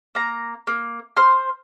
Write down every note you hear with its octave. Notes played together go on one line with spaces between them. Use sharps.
A#3 A#5
A#3
C5 C6 F6